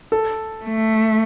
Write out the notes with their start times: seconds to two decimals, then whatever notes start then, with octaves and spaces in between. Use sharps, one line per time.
0.12 A4
0.65 A3